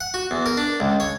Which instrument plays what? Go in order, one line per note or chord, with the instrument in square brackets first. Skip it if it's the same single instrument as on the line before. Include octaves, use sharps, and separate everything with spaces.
[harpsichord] F#5
F#4
E2
A#4
D4
C#2
C#5